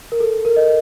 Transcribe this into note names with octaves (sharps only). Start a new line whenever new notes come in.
A#4
A4
A#4
D#5